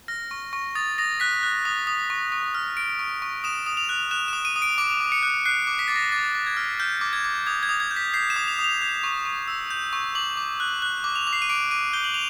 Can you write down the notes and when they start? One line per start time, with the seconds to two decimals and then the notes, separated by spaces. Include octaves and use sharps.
0.08 F6 A#6
0.31 C#6
0.53 C#6
0.75 D#6 A6
0.98 D#6 A#6
1.20 F#6 B6
1.43 F#6
1.65 D#6
1.87 D#6
2.10 C#6
2.32 C#6
2.55 F6
2.77 F6 D7
2.99 C#6
3.22 C#6
3.44 D#6 E7
3.66 D#6
3.77 F7
3.89 F#6
4.11 F#6 E7
4.28 E7
4.33 D#6
4.45 D#7
4.56 D#6
4.62 D7
4.78 D6 D7
5.01 D6
5.12 C#7
5.23 F#6
5.45 F#6 C7
5.63 C#7
5.67 D6
5.79 B6
5.88 D6 A6
5.96 A#6
6.12 D6 A6
6.35 D6
6.47 G#6
6.57 F6
6.80 F6 G6
7.01 D6
7.13 G#6
7.24 D6
7.47 D#6 G#6
7.63 G#6
7.69 D#6
7.80 G#6
7.91 G6
7.97 B6
8.14 G6 C7
8.30 E7
8.36 D#6
8.48 F7
8.59 D#6
8.64 F7
8.81 G6
9.04 C#6
9.25 C#6
9.48 E6
9.70 G6
9.93 C#6
10.15 D6 F#7
10.37 D6
10.60 F#6
10.82 F#6
11.04 D6
11.16 F7
11.27 D6
11.33 C7
11.42 D#7
11.49 D6 D7
11.71 D6 D#7
11.93 G6 G7
12.04 F#7
12.14 F7